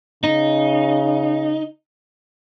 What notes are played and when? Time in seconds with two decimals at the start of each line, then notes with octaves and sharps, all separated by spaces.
0.24 C#3 D#4